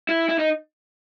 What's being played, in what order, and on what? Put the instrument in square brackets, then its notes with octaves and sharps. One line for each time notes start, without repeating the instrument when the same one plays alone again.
[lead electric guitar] E4
E4
D#4